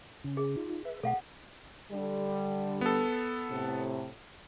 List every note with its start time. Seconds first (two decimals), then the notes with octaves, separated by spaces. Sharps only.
0.24 C#3 C#4
0.37 G#4
0.57 D#4 F4
0.85 B4 E5
1.03 B2 A3 A4 F5 F#5
1.92 D3 G3
2.81 B3 A4
3.51 A2 C3